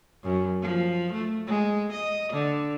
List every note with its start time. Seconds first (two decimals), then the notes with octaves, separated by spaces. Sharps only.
0.24 F#2
0.62 F3
1.13 A3
1.47 G#3
1.92 D#5
2.33 D3